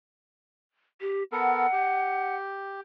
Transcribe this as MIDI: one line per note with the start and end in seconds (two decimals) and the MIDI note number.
1.01 1.23 67
1.32 1.67 59
1.32 1.67 69
1.32 1.67 70
1.32 2.35 78
1.73 2.80 67